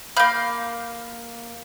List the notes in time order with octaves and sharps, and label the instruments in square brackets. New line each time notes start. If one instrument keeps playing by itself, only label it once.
[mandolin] A#3 F5 [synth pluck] B5 G6